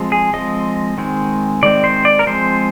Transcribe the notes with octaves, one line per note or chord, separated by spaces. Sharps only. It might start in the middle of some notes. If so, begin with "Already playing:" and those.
Already playing: F3 G#3 C4
G#4
F3 G#3 C4 D#5
D#3 G#3 C4
D#3 G#3 C4 D5
C5
D5
A#4
F3 G#3 C4 C5